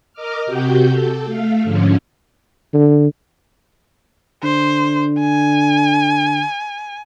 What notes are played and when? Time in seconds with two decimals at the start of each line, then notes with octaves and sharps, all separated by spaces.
0.13 A#4 D#5 D6 F6
0.46 C3 F#4 G4 G6
0.92 A4
1.25 A3 F5
1.64 G#2 D3 F3 C#4
2.74 D3
4.43 D3 C5
5.20 G#5